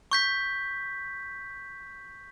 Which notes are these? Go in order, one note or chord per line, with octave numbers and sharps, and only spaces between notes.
C#6 G6 B6